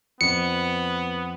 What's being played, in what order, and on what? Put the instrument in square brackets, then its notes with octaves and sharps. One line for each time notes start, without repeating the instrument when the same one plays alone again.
[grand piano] F2 [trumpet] B3 [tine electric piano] C#7